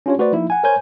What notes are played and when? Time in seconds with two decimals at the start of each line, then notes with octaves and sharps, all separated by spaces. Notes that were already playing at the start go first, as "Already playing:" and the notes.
0.06 C#4 D4 F4 G4 C#5
0.18 A3 F#4 B4 C5 D5
0.32 F3 A#3 D#4 E4
0.50 F#5 G#5
0.63 A#4 C5 C#5 G#5 G6